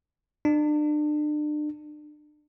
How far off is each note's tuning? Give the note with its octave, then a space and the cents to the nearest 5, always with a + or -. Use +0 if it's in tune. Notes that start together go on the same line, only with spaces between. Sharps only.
D4 +35